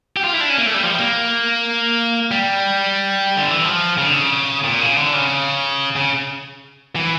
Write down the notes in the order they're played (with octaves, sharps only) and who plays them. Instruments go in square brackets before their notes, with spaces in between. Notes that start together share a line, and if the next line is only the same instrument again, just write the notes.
[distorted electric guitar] G4
F4
E4
D4
C#4
A#3
A3
G3
F3
G3
A#3
G3
D3
E3
F3
C#3
D3
C#3
A#2
C#3
D3
C#3
C#3
E3